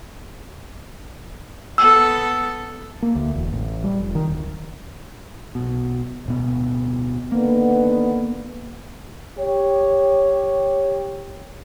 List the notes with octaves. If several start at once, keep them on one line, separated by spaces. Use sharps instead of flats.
B3 A4 E6
A#3
D2
E1
A1
G3
F1
D#3
D1
B1 B2
D1 B2 B3
D3 D#3 A#3 B3
G4 C#5